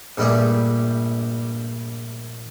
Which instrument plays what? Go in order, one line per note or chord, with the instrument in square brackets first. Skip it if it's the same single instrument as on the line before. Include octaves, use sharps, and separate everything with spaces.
[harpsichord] A#1 G2 G3 A3 G#4